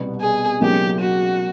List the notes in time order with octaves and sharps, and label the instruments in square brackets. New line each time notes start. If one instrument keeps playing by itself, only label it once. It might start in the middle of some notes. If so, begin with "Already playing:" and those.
Already playing: [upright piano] C2 B2 G3 B3
[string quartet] G#4
[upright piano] C#2 B2 F#3 A#3 D#4 [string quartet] G4
[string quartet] F#4